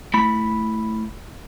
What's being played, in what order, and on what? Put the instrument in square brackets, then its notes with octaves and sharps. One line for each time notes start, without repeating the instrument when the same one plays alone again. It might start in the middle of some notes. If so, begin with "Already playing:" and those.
[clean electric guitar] A3 E4 B5